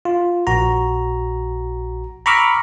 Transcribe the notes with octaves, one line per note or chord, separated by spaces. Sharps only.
F4
A#1 F#4 A#5
A#5 B5 C#6 D6 E6 F6